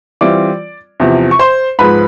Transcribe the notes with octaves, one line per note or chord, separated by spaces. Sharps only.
E3 G3 C4 F4 D5 D6
E2 C3 F3
C#6
C5 C6
G#2 F3 G#3 B4 B5